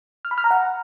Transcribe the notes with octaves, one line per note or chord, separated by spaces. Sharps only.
F6
B5
F6
A#5
F#5